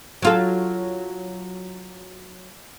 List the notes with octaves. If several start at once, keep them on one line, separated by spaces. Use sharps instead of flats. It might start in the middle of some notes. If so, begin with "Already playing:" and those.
F#3 F4 A4